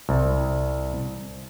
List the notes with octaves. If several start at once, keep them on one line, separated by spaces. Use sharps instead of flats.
C2